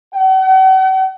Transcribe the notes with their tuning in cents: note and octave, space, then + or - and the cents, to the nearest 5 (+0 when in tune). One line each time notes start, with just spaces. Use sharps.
F#5 +45